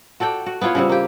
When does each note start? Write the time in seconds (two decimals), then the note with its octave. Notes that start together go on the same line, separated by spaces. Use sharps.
0.20 F#4 A4 D5 G5
0.46 F#4
0.61 B3 E4 F4 C#5
0.75 C#3 G3 C4
0.89 A#3 G4